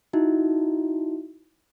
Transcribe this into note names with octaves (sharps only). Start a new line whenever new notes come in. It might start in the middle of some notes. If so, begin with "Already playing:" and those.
D#4 E4 F#4